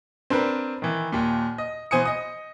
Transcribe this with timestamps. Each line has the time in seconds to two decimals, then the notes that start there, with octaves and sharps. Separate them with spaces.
0.30 C4 D4 A#4 B4
0.82 D#3 E3
1.12 D#2 A#2
1.58 D#5
1.91 B2 E3 C5 G#5 D#6 C#7
2.05 D#5 D#6